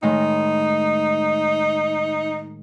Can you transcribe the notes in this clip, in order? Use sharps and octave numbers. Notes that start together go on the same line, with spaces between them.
A2 D#3 G#3 D#4